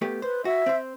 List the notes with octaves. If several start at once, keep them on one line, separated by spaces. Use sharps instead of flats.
A3 B3 G4
B4 C5
F#4 E5
C4 C5